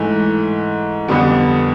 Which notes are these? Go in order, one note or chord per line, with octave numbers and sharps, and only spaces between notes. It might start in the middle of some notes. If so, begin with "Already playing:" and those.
Already playing: G#2 E3 A3
F2 D3 G3 B3